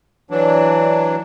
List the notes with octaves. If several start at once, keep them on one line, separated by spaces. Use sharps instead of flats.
E3 F#3 D4